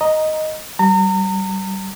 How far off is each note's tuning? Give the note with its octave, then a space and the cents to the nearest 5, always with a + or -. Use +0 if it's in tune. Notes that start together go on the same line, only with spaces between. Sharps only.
D#5 +0 A#5 +0
G3 -35 A#5 -35